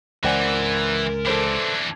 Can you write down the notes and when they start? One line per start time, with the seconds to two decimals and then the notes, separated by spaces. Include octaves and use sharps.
0.24 C#2 E3 A#4 C5 D5 F#5 G#5
1.26 E3 D4 A4 C5